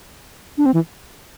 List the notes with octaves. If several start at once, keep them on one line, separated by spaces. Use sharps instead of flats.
D4
C4
E3